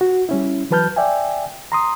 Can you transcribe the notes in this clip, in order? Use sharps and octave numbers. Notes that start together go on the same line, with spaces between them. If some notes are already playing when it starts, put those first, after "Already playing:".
F#4
G3 C#4 E4
E3 F#3 B4 A5 F6 G6
D5 E5 G5 G#5
A#5 C6 D#6